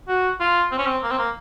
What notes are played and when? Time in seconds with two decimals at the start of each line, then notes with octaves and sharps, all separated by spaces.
0.08 F#4
0.40 F4
0.72 C4
0.78 C#4
0.86 C4
1.03 A#3
1.11 C4
1.19 A#3